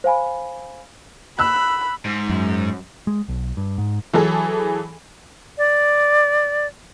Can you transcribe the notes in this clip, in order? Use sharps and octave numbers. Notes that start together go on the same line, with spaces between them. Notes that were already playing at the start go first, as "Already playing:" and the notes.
C5 F5 G#5 B5
B5 E6 F#6
G#2
F#2
G#3
B1
G2
G#2
E3 F#3 G#4 A4
D5